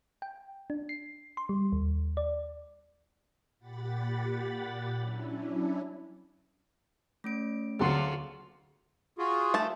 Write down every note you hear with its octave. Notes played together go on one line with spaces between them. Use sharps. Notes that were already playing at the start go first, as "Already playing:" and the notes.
G5
D4
C7
C6
G3
D#2
D5
A#2 G4 F#5 B5 A6
F#3 C#4 D4 E4
A3 C#4 D7
D2 D3 F#3 F4 F#4 G#4 C6
F4 F#4 G#4
A3 A5